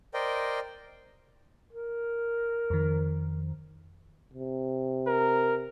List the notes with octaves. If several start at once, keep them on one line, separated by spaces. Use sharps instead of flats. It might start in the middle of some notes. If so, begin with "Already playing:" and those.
A#4 C5 D5 D#5 G5
A#4
F2 D#3
C3
A#4